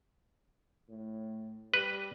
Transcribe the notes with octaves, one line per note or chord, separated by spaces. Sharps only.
A2
G3 B4